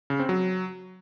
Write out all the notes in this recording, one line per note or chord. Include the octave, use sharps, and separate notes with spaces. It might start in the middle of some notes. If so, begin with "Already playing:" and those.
C#3
C4
F#3